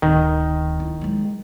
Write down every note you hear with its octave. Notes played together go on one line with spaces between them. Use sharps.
D1 D#3
E4
F#3 G#3